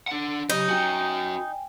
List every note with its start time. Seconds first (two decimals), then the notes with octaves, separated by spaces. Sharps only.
0.07 D4 F#5
0.50 C#3 F#3 D#4 G4
0.68 C#4 F#4 G5 G#5